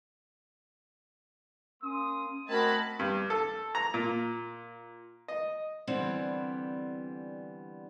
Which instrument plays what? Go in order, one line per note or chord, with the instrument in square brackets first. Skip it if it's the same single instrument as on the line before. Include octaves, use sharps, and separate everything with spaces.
[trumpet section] A#3 C6 D#6 [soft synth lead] C#4
[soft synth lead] A3 [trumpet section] C4 D#5 [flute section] F#4 A#4 G#6 [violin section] A5 B5
[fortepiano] G2
A4
A#5
A#2
D#5
[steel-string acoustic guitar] D3 E3 G3 B3 C4